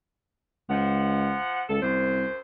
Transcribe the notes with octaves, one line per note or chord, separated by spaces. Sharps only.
C#2 F3 F#5
C#2 A4
C2 F#2 C5